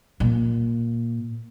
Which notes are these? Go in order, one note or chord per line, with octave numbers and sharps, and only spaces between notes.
A#2